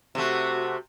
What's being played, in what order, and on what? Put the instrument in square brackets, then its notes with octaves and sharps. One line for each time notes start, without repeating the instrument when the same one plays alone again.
[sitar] C3 A3 [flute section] F#4